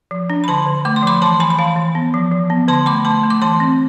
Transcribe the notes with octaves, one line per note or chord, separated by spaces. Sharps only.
F3
D4
B5
D3 A5 C6
D3
A3 D6
C6
F3 B5 D6
E3 A5 C6
E3 G#5 B5
B5
E3 F5 A5
E3
B3
F3
F3
B3
D3 A5 C6
A3 B5 D6
A3 A5 C6
A3
D6
E3 A5 C6
C4